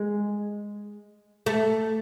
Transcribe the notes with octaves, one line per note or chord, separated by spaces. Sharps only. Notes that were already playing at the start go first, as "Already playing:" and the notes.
Already playing: G#3
A3